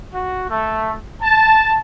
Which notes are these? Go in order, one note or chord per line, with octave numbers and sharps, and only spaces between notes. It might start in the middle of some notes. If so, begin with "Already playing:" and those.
F#4
A3
A5